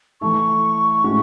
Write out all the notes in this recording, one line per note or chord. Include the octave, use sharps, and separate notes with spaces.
E3 A3 E4 A4 C#6
A2 G#3 C#4 F#4